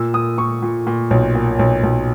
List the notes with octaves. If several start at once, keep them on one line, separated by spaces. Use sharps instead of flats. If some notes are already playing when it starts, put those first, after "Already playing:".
Already playing: A#2 E6
A#2 D#6
A#2 C#6
A#2
A#2
B1
A#2
B1
B1